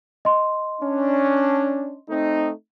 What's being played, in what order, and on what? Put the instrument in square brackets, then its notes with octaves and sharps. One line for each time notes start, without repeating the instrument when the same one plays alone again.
[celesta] D#5 C6
[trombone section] C#4 D4
A3 C4 D#4